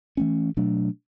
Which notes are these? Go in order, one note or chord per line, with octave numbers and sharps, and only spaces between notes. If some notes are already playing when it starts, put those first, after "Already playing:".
E3 A3 C#4
B2 F#3 A3 D4